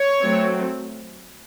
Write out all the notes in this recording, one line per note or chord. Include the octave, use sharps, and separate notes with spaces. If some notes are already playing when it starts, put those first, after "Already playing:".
Already playing: C#5
F#3 A3 C4